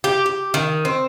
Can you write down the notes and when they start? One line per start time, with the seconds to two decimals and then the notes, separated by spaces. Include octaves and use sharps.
0.04 G4
0.26 G4
0.54 D#3
0.85 C4